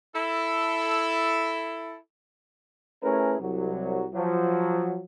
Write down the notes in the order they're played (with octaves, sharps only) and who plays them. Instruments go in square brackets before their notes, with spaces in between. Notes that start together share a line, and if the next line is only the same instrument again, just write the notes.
[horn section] E4 A4
[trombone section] A3 C#4 E4 G#4 A#4 B4
C2 F#3
F3 F#3